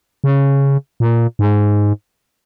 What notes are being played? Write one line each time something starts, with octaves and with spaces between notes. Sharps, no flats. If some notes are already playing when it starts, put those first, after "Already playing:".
C#3
A#2
G#2